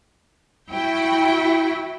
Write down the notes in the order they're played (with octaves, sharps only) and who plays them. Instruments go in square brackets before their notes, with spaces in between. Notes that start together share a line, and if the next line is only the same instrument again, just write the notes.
[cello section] E4 F#4 [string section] G5